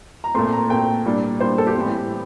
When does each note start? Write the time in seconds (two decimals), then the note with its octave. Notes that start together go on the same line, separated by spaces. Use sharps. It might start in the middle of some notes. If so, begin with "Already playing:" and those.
0.24 A#5
0.34 A#2 A3 C4 C6
0.52 A#5
0.70 A#2 A3 C4 G5
1.05 A#2 G3 D4
1.40 A#2 G3 D4 C5
1.58 A4
1.67 G4
1.75 A2 E3 G3 C4